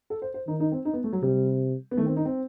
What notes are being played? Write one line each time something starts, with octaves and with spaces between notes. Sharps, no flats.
A4
C5
C5
D#3 D#4
D#4
C4
D#4
B3
A3
F#3
C3 G3
B3
D#3 A3
C4
D#4
C4